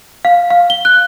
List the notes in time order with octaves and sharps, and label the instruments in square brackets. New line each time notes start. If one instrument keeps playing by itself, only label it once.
[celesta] F5
F5
G7
F#6